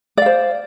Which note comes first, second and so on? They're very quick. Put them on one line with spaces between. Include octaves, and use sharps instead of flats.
D5 F5 C5